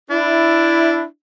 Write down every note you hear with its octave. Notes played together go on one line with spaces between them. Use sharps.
D4 E4